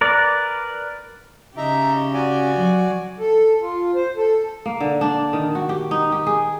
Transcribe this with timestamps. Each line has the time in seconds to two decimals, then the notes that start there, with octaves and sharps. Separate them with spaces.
0.01 A#4 B4 D5
1.57 C#3 D#4 G4 E5 A#5
2.14 F#4 D5 G#5
2.57 F#3
3.19 A4
3.61 F4
3.95 C5
4.17 A4
4.66 A#3
4.80 D3
5.01 D4
5.33 D#3
5.55 F#4
5.69 G4
5.91 D#4
6.12 G4
6.26 G#4